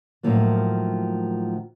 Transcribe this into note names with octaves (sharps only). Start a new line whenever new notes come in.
A2 D#3 F3 F#3 A#3